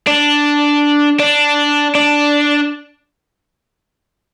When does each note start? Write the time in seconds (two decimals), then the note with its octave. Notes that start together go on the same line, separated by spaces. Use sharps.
0.07 D4
1.20 D4
1.95 D4